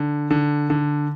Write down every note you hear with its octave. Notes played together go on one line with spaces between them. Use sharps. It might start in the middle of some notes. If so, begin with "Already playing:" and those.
Already playing: D3
D3
D3